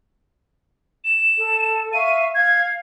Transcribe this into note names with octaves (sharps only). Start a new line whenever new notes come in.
E7
A4
E5 F5 C#6 D#7
F5 G#6